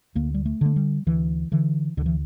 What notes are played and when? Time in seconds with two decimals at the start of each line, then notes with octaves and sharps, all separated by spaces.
0.15 D2 A#3
0.34 G3
0.46 A3
0.61 D3 A3
0.76 G3
1.07 D2 E3
1.52 D3 E3
1.97 D2 D3
2.06 E3